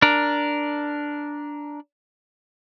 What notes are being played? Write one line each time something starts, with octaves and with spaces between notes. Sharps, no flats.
D4 A#4